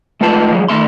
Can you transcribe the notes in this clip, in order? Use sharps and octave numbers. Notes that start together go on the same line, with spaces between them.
G#3 A3 F4 B4 A5
F3 F#3 G#3
D#3 A3 E5 C6